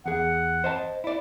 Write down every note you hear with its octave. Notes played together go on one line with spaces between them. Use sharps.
E2 G#4 F#5
C5 D#5 A5
E4 D5